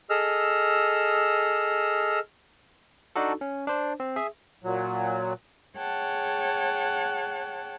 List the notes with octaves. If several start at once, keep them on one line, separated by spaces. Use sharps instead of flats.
G#4 A4 D#5 E6 F6
D4 D#4 F#4 A4
C#4
D4 C5
C4
G#4 E5
A#2 F#3
G#4 C#5 F#5 G5 A5